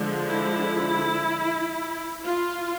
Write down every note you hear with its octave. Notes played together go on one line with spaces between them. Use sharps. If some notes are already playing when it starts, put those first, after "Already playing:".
Already playing: D3 F3 G#3
E4
F4